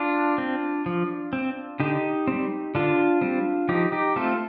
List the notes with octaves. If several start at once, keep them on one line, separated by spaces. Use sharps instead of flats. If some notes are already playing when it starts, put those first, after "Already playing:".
Already playing: D4 F4
C4
F3
C4
D3 D#4 G4
G3 C4
D3 D4 F4
G3 C4
F3 D#4 G4
D#4 G4
A3 C4 F4 A4